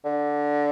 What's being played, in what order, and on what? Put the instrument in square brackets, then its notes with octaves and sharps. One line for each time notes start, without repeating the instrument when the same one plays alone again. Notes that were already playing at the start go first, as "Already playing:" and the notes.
[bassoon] D3